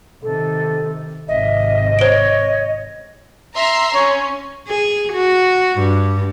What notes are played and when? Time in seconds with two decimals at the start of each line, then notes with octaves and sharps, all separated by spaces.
0.23 C3 D#3 A4
1.28 G#1 C3 D#5 E5
1.99 C5 C#5 D7
3.55 E5 A#5 C6
3.95 C#4 C#5
4.68 G#4
5.13 F#4
5.79 G2